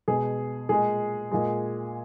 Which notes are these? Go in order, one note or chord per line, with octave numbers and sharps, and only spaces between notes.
B2 G#3 G#4
A#2 G#3 G#4
A#2 G#3